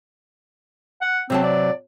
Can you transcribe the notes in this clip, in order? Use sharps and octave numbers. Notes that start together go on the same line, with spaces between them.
F#5
C3 F#3 C4 A5
D5